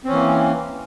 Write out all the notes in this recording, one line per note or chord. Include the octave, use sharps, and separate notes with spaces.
E3 A#3 C4 C#4